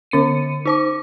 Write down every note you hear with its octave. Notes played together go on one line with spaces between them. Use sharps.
D3 C#4 C#7 D#7
D#4 C5 D6